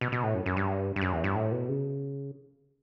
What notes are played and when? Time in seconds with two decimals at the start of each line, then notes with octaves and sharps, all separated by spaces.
0.01 B2
0.12 B2
0.23 A2
0.34 F#2
0.46 F#2
0.57 G2
0.96 G2
1.02 F#2
1.12 E2
1.24 G2
1.35 A2
1.52 B2
1.69 C#3